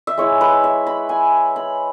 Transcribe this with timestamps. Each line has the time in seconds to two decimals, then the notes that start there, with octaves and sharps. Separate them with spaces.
0.07 E5
0.18 G#3 E4 C#5
0.41 B4
0.64 E5
0.87 B5
1.09 G#5
1.56 B5